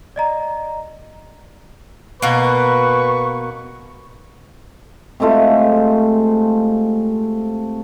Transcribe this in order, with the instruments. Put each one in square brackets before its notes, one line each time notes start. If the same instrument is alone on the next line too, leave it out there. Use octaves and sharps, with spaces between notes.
[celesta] D5 D#5 A#5
[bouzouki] B2 A#3 [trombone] B4 [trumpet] C#6
[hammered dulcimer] C3 G#3 A3 F4